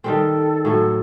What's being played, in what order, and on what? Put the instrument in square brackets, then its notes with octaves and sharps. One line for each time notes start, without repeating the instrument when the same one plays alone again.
[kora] D#3 G3 C4 [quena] A4
[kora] A2 F#3 [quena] A4